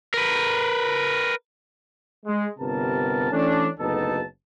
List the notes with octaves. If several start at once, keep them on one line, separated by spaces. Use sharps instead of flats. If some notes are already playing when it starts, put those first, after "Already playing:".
A#4 B4
G#3
G1 C3 B3 A#4 A5
E3 A3 C#4 D4
F#1 D2 B3 D#4 A4 A5